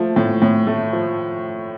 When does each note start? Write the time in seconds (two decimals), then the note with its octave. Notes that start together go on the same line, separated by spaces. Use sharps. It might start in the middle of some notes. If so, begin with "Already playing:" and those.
Already playing: F3 A3
0.16 A2
0.42 A2
0.67 A3
0.93 F3